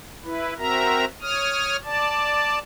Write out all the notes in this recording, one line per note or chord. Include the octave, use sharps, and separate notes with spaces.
E4 B4
C4 F#4 A#4 E5 A#5
C#5 D#6 F6
D5 A5